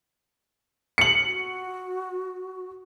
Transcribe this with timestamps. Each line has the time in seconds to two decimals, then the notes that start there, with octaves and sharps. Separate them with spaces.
0.98 C#7 F#7
1.25 F#4